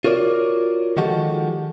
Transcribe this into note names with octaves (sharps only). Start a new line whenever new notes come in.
F4 F#4 A#4 C#5 D5
D#3 F3 G#3 F#4 G4 A4